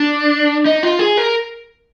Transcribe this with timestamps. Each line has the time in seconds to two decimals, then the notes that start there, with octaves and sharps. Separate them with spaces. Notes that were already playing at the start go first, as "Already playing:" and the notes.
Already playing: D4
0.66 D#4
0.83 F4
0.99 G#4
1.17 A#4